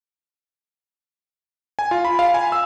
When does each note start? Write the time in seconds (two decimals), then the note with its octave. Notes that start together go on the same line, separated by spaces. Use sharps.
1.79 G#5
1.91 F4
2.05 B5
2.19 F5
2.34 G#5
2.52 E6